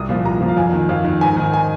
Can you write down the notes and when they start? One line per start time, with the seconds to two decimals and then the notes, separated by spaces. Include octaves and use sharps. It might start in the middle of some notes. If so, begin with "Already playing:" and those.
Already playing: C2 D#6
0.09 A#2 F3
0.25 C2 A#5
0.41 A#2 F3
0.48 F5
0.57 F2 G#5
0.73 D#3
0.89 F2 F5
1.05 D#3
1.21 G#2 G#5
1.37 D#3
1.54 G#5